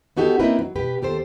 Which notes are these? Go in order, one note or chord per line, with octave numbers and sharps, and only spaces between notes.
B3 D#4 F#4 G4 A4
A#3 C4 C#4 D#4 E4 B4
F#3
B2 G4 B4
D#2 G4 A4 C5